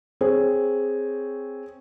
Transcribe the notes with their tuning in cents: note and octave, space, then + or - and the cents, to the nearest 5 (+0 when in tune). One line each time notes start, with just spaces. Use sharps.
C4 +0 G#4 +0 C#5 +0